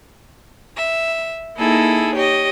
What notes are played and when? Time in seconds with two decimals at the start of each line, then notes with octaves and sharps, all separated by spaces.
0.75 E5
1.56 A#3 D#4 E4 G#4 A4
2.15 G4 C#5 D#5